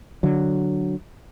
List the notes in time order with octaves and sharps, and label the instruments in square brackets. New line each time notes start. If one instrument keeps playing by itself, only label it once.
[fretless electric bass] D3 F#3